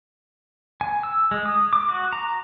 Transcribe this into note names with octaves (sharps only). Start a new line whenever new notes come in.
G#5
E6
G#3
D#6
D6
F#4
A#5